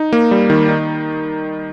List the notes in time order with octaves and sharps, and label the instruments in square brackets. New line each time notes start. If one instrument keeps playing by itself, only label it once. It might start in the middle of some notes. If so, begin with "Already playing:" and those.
Already playing: [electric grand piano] D#4
A#3
G3
D#3
D#4